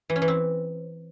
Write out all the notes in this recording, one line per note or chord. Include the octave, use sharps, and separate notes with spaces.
E3
C#4
E3
C4